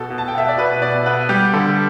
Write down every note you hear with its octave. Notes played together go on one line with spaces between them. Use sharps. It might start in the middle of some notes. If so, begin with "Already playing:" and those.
Already playing: B2 A4
B2
A5
G5
B3 E5
D5
B2 B4
B2 D5
B3 B4
G3 G4
D3 A4